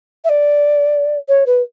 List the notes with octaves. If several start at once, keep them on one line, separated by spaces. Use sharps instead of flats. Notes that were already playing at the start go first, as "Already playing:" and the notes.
E5
D5
C#5
B4